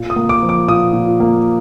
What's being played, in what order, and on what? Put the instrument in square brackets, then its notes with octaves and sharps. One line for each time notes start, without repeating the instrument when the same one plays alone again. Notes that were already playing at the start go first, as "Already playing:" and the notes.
Already playing: [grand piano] A#2
D#6
A#3
D6
F3
D6
A#2 D#6
A#2
A#3